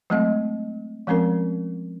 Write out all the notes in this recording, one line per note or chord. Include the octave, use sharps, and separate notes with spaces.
F#3 G#3 A3 C4 D#5
F3 G#3 C4 C#4 A#4